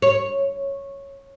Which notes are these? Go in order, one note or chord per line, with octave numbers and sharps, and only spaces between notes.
C#5